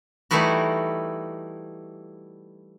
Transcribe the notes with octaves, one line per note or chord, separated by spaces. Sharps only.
E3 G3 A3 D#4 E4 F#4